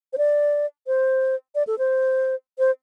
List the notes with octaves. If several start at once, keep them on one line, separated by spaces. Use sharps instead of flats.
C5
D5
C5
D5
A4
C5
C5